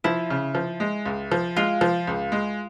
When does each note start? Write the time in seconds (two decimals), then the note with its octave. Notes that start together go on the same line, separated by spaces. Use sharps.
0.04 F3 E4
0.30 C#3
0.55 F3
0.80 G#3
1.06 C#2
1.32 F3
1.56 G#3 F4
1.81 F3
2.07 C#2
2.32 G#3